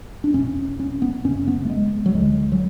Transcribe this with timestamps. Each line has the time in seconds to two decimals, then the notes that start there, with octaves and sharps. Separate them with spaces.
0.24 D4
0.34 E2 B2 C#4
0.79 C#4
1.02 B3
1.24 F#2 C#3 C#4
1.48 B3
1.65 A3
1.70 G#3
2.06 F#3
2.15 D2 D3 G#3
2.52 F#3